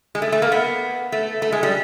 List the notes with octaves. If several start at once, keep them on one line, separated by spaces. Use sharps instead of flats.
G#3
A3
A3
A#3
B3
A3
A3
G#3
G3